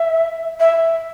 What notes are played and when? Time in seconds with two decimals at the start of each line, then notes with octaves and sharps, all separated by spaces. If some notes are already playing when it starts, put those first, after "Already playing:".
Already playing: E5
0.60 E5